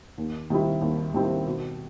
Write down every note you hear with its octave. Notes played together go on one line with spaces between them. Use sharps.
D#2
D#3 G3 C4 E4
D#2
D#3 G3 C4 E4
B2